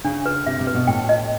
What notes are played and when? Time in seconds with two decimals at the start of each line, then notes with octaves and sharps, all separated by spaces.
0.04 C#3 D4
0.26 B4
0.46 C3 E5
0.60 C3
0.67 B4
0.74 B2
0.87 A2 G5
1.09 D#5